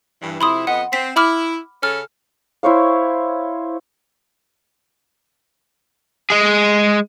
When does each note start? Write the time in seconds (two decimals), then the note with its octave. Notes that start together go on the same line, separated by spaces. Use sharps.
0.22 G2 E3
0.41 F2 C3 E4 B5 C6 D#6
0.67 F2 B3 D#5 F#5
0.93 C4 B6
1.17 E4 B5 D6 F6
1.83 C#3 C#4 A4 F6
2.63 E4 C5 C#5 F5
6.30 G#3 G#4